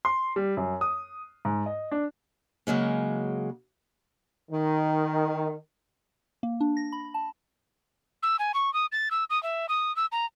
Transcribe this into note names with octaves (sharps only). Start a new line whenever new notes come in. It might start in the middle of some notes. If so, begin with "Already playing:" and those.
C6
G3
F#2
D#6
G#2
D#5
D4
C#3 F#3 G#3 A#3
D#3
A#3
D4
A#6
B5
A5
E6
G#5
C#6
D#6
A6
E6
D#6
E5
D#6
E6
A#5